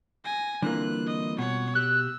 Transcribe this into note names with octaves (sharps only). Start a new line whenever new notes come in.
G#5 A#6
D3 E3 G3 A#3 C4 F4 F#6
D#5
B2 C#5 F#5
G4 E6 F#6